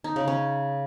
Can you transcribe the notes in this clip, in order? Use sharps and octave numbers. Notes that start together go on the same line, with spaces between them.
D#4
C#3
C#4